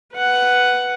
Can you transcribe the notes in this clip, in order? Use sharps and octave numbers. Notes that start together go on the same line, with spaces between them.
B4 F#5